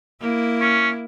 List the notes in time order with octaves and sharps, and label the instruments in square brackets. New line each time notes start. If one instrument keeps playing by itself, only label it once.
[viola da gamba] A#3 E4
[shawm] C#4